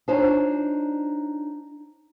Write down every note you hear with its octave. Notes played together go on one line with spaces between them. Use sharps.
D4 D#4 F4 C5 C#5 G#5